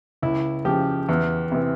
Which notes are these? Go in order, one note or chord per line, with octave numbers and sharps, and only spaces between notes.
C#2 E4
C#3 F3 G4
E2
C3 E3